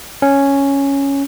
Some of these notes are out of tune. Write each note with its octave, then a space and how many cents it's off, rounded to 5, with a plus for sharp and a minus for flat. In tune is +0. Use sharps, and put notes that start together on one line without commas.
C#4 +0